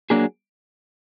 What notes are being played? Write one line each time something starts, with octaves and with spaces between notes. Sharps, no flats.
F#3 A#3 D4 G#4